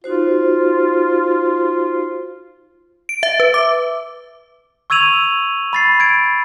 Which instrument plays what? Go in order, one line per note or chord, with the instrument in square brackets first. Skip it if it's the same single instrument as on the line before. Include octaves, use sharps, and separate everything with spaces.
[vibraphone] D#4 F#4 C5 [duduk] F4
[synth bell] D7
E5
B4
D6
[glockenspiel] C#6 E6 G#6 D#7 F7 F#7
B5 A6 C7
G#6 D7